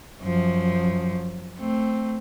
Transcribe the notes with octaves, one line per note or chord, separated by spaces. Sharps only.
F#2 F3
A3 C4